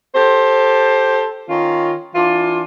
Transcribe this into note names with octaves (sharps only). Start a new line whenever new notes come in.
G4 A4 C5
D#3 C#4 F4
E3 D4 F4